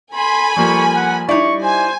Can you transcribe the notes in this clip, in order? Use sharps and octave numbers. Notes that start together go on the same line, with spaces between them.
A4 G#5 B5 C6
F3 G3 A#3 C#6
F#5
G3 D#4 E4 D5 C#6
C5 G#5